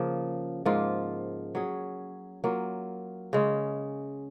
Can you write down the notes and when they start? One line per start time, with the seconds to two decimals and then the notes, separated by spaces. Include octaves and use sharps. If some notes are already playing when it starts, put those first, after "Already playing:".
Already playing: C#3 F3 A#3
0.65 G#2 F3 A#3 F4
1.55 F#3 C#4 G#4
2.44 F#3 A#3 F4
3.33 C#3 G#3 C#4